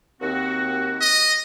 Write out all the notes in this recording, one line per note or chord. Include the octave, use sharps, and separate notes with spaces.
D#2 C4 F#4
D#5